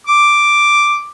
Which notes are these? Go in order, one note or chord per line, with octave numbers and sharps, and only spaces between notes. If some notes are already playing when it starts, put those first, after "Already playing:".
D6